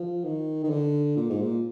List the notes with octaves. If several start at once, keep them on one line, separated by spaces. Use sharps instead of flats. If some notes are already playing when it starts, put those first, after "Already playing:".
Already playing: F3
D#3
D#3
D3
A#2
G#2
A#2